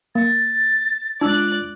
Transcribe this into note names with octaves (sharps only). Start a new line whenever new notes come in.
A#3 A6
G#3 D4 F4 D5 E6 F#6